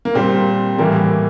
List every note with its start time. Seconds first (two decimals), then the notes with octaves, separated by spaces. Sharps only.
0.05 A#3
0.15 A#2 G3 C4
0.78 A2 E3 G3 A#3